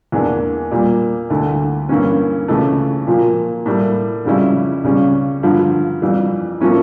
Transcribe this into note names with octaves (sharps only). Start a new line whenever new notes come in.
E2 E3 A#3 D4
A#2 G3 A#3
D2 D3 A3 E4
G2 E3 A#3 C#4
C#2 C#3 E3 A3
A#2 F3 A#3
A2 G3 A#3 E4
F2 C#3 G3 C#4 E4
C#2 C#3 G3 C#4
G2 D3 F3
F2 E3 G3
A2 F3 A#3 C#4 E4